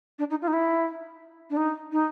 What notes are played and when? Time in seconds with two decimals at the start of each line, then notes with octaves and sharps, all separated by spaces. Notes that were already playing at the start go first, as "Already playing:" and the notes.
0.19 D4
0.30 D#4
0.42 F4
0.48 D#4
0.53 E4
1.50 D4
1.57 D#4
1.92 D#4